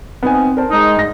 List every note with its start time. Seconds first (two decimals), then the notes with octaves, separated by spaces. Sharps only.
0.23 B3 C4 D#4 G#5
0.57 A#4 C5 A5
0.71 G#3 D#4
0.97 G#2 A#6